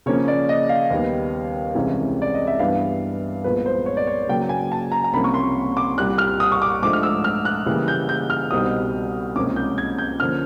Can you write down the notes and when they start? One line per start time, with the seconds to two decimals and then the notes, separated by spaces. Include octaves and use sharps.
0.06 C#3 F3 A#3 C#4 C#5
0.28 D5
0.49 D#5
0.69 F5
0.90 D#2 D#3 G3 B3
1.75 C2 C3 E3 G#3 C#4
2.22 D5
2.34 D#5
2.47 E5
2.59 G2 E3 G3 B3 D4 F5
3.44 C2 A#2 F3 G#3 B3 B4
3.66 C5
3.86 C#5
3.97 D5
4.07 C#5
4.28 C#3 F#3 A#3 G5
4.49 G#5
4.72 A5
4.92 A#5
5.04 A#5
5.13 C2 C3 F3 A#3 C#4 B5
5.24 C#6
5.34 C6
5.77 D6
5.98 C2 A#2 G3 F#6
6.18 F6
6.40 D#6
6.52 C#6
6.62 D6
6.82 G#2 F3 A3 D4 D6
6.93 F6
7.03 E6
7.24 F6
7.45 F#6
7.66 C#3 E3 G3 A#3
7.88 G6
8.09 G6
8.30 F6
8.51 C2 B2 G3 C4 D#4 D#6
9.36 C#2 C3 F3 A#3 C#4 D6
9.56 G6
9.78 G#6
9.98 G6
10.20 D3 F3 A#3 C#4 F6